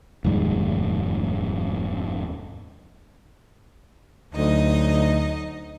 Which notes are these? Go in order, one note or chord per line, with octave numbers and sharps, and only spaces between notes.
F1 D#2 G#2 G3
D2 F#3 D#4 D#5